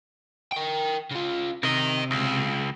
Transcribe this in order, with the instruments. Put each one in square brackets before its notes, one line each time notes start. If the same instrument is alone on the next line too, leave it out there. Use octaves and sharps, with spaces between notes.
[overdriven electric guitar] A#4 G5
C#3 F4
[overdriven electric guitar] C3 [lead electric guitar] A#4 D#5
[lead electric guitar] C#2